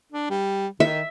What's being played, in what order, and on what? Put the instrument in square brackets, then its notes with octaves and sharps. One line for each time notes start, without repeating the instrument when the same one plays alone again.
[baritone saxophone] D4
G3
[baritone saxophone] D#3 [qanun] E5